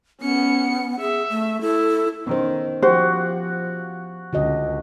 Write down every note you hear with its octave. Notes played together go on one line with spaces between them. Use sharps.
B3 C#4 C#7
G#4 E5
A3
E4 A4
D#3 B3 C#4 C5
F3 F#4 G4 C5
C#2 D3 F#4 D#5